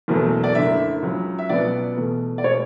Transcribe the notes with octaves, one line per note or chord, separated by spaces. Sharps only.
F#1 E2 B2 F#3 A3
D5
F#1 F#2 D3 E5
C#2 C#3 F#3
E5
C#2 B2 F#3 B3 D5
E2 B2 A3
D5
B2 G#3 B3 C#5